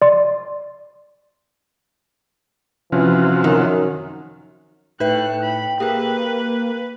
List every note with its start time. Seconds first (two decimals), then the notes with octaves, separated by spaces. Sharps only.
0.02 D5 C6
2.92 C3 E3 F3 C#4 F4 F#4
3.44 F#2 D#3
5.00 A2 A3 D#4 B4 E5 G5 F#6
5.42 B5
5.80 A#3 G4 G#4 B4